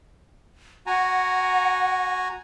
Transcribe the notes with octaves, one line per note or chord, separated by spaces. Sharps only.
F#4 F#5 G#5 A#5